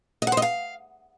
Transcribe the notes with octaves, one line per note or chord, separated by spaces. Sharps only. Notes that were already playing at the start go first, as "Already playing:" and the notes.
D#5
F#5
C5
D#5
F5